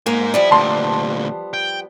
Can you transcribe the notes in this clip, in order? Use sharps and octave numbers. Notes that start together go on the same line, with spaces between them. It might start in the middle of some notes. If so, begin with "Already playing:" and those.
G#2 A#3 G#5
F3 G3 B3 E4 D5
D2 A#2 A5 C6
G5